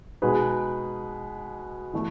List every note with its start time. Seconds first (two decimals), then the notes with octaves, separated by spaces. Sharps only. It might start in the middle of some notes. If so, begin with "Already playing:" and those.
0.22 B2 G#3 D#4 G#4 B4
1.93 E3 A3